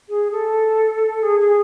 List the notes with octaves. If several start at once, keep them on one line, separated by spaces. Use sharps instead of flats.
G#4
A4
G#4
G#4